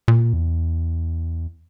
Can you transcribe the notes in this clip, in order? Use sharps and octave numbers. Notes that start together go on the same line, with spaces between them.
A#2
E2